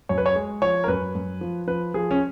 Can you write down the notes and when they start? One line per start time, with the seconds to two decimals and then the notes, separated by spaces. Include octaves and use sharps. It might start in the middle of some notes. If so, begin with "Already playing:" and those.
0.09 F#2 C#5
0.18 B4
0.26 C#5
0.35 G#3
0.62 F3 C#5
0.84 A#4
0.88 F#2 B4
1.15 F#2
1.41 F3
1.67 F3 B4
1.94 F3 G#4
2.11 C#4